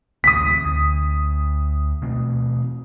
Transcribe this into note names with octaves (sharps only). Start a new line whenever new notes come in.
A1 D2 C3 D#6 B6
D2
B2 A3 C4